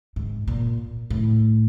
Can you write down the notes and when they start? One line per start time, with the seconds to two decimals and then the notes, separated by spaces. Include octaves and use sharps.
0.16 G#2
0.47 A#2
1.10 A2